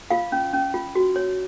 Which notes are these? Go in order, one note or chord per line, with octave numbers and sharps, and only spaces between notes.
F4 F5
C#4
C#4
F4
F#4
C#5